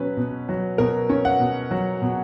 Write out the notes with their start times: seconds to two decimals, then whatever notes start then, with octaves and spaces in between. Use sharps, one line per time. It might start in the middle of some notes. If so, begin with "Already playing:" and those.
Already playing: B2 F#3 C#4 B4
0.17 B2
0.49 F#3
0.78 B2 A#4
1.09 C#4
1.25 F#5
1.40 B2
1.71 F#3
2.02 B2